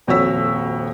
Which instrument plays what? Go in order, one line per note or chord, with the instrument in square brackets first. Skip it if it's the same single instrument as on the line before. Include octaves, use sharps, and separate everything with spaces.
[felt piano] D#1 F2 F#4 C#5 E6 B6